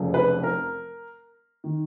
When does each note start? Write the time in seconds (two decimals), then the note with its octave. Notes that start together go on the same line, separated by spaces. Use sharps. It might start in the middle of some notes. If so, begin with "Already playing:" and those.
Already playing: F1 F2 C#3
0.14 B4
0.43 A#4
1.64 D#3